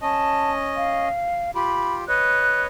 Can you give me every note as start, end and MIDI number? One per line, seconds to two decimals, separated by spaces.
0.01 1.08 61
0.01 1.08 75
0.01 0.51 81
0.77 1.51 77
1.55 2.04 65
1.55 2.04 67
1.55 1.95 83
2.08 2.67 71
2.08 2.67 73
2.08 2.67 75
2.08 2.61 90